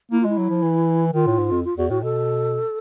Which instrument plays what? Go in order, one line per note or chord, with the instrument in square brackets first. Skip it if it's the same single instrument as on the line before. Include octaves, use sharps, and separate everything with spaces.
[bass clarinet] A#3 [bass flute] E4
[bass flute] F4
[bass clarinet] G#3 [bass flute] E4
[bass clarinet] F#3
F3
E3
[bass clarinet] D#3 [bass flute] F4
[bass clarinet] A2
G#2
F2
[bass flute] F4
[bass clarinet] E2 [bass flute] F#4
[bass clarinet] A2 [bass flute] F#4
[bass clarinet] B2 [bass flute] A4